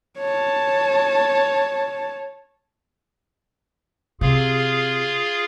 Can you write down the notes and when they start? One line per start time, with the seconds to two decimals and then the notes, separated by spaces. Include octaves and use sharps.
0.19 C#5 A5
4.21 C3 F4 G#4 F5